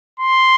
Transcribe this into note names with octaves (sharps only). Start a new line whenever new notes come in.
C6